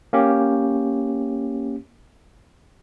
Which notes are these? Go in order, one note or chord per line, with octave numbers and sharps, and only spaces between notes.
A#3 C#4 G4